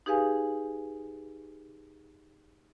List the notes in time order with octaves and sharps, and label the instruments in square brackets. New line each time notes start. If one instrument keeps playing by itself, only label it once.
[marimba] D#4 G4 G#4 B4 F5 G#5